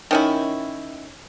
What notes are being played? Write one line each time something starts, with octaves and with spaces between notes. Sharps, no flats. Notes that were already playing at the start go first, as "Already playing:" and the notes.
D#3 C#4 E4